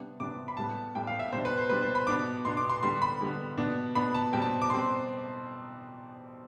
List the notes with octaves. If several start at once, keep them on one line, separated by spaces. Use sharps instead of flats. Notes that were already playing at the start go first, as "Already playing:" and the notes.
Already playing: C3 G3 B3 D4
C3 G3 B3 D4 D6
B5
A2 G3 B3 A5
A2 G3 B3 G5
F5
E5
B2 G3 D4 C5
B4
C5
B2 G3 D4 B4
C5
B5
B2 B3 D4 D6
B2 B3 D4 C6
D6
C6
D3 G3 B3 C6
B5
D3 G3 B3
B2 B3 D4
B2 B3 D4 B5
A5
B2 G3 C4 G5
A5
D6
B2 G3 C4 C6